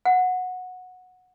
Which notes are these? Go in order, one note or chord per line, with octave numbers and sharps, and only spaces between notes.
F#5